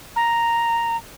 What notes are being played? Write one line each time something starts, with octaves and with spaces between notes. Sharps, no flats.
A#5